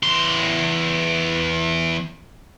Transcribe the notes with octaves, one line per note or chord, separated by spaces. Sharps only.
E2 C6